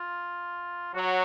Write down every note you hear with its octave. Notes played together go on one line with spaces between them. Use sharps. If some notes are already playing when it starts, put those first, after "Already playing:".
Already playing: F4
F#3 F#4